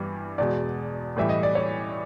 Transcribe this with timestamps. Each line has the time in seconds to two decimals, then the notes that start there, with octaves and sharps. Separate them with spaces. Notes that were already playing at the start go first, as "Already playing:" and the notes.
Already playing: G2 E3 G3
0.38 E2 B2 G#3 D5
1.17 A2 E3 G3 E5
1.29 D#5
1.43 D5
1.55 C#5